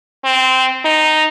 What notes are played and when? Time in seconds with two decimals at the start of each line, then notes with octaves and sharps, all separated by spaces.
0.24 C4
0.85 D#4